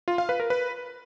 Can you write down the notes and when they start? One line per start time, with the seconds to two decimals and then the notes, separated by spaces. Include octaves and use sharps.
0.08 F4
0.18 F5
0.29 B4
0.40 A#4
0.50 B4